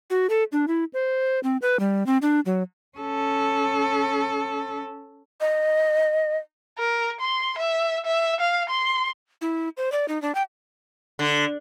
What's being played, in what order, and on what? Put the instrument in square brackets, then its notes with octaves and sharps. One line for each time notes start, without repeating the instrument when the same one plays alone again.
[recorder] F#4
A4
D4
E4
C5
C4
B4
G3
C4
D4
F#3
[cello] C#4 A4
[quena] D#5
[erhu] A#4
C6
E5
E5
F5
C6
[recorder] E4
C5
D5
D#4
D4
G5
[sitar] D3